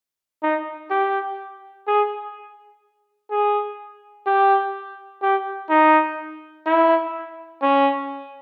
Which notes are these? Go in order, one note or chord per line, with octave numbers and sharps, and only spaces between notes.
D#4
G4
G#4
G#4
G4
G4
D#4
E4
C#4